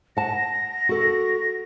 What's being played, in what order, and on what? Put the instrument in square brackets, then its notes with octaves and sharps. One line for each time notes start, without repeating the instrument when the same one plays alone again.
[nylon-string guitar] F#5 A5 [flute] A#6
[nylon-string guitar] F#4 A4